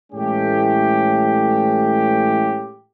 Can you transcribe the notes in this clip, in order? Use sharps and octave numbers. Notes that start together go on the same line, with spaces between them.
A2 E3 G#3 A3 C#4 G4